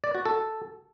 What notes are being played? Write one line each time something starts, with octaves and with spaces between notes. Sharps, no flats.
D5
F#4
A4